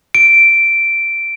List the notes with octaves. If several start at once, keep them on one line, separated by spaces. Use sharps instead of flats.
D7